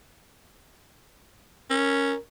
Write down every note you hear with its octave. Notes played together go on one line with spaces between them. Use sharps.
C#4 A#4